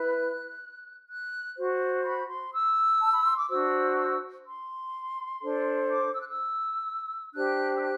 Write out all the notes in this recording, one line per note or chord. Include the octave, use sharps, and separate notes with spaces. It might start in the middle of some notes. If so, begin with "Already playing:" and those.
Already playing: E4 B4 F#6
F#6
F#4 C5
B5
C6
E6
A5
B5
C6
D6
D4 F#4 C5 E6
E6
C6
D4 A4 C5
D6
E6
F#6
E6
D4 G4 C5 F#6
E6
F#6